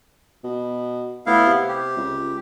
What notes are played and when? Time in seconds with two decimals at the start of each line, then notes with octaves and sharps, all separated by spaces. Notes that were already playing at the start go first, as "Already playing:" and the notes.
0.44 B2
1.27 A2 B3 E4 F5
1.46 C3
1.69 G4
1.97 C#2